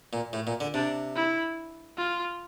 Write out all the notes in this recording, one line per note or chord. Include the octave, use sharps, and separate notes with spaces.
A#2
A2
A#2
D3
C3 D4
E4
F4